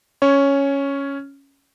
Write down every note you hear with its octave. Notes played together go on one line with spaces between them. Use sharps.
C#4 C#5